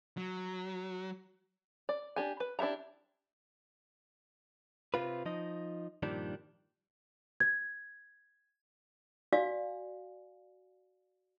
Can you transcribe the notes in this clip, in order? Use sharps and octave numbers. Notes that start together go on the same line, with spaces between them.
F#3
D5
D4 G4 G#5
B4
D4 E4 G4 E5 A#5
C3 C4 F4 B4
F3 D#4 D#5
G2 A#2 D#3 F3 G3 D4
G#6
F#4 D5 F5 G#5